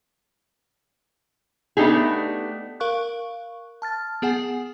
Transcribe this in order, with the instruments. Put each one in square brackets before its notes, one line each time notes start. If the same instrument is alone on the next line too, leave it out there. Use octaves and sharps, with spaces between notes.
[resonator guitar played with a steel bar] A3 B3 D4 D#4 G4 G#4
[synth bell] A#4 F5 C#6 F#6
A5 F6 A6
B3 G#4 F#5 G#5